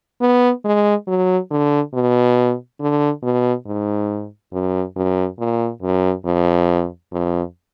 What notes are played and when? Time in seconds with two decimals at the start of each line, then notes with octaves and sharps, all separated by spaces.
0.21 B3
0.65 G#3
1.08 F#3
1.51 D3
1.94 B2
2.80 D3
3.23 B2
3.66 G#2
4.53 F#2
4.96 F#2
5.39 A#2
5.82 F#2
6.26 F2
7.12 F2